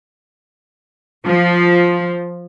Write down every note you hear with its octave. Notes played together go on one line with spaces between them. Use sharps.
F3